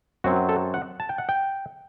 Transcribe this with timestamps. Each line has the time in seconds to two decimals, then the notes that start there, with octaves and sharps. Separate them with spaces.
0.24 F#2 F#3 C4 F#4
0.49 A4
0.74 F#5
1.00 A5
1.09 G5
1.18 F#5
1.29 G5